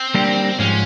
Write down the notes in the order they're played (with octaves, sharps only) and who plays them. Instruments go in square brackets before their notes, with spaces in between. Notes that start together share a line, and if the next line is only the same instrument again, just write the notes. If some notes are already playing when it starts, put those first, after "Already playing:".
Already playing: [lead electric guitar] C4
[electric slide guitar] G3 A#3 D4 G4
[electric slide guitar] G#2 F3 G#3 [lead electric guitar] C#4